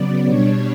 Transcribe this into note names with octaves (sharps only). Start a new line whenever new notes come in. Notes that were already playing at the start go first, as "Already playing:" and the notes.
Already playing: C#3 F#3 B3 D5
B2 G3 D4 C#5